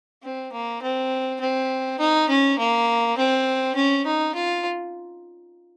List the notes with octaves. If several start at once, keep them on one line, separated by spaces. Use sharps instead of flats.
C4
A#3
C4
C4
D#4
C#4
A#3
C4
C#4
D#4
F4